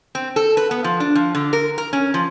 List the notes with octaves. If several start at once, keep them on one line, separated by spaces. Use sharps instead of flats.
C4
A4
B4
B3
F3
D4
F3
D3
A#4
A#4
C#4
F3